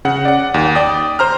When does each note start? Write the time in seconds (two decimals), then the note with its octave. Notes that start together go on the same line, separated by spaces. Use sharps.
0.05 C#3 F#5
0.25 D5 F#5
0.54 D#2
0.75 D5 G5 D#6
1.19 C5 A#5 F6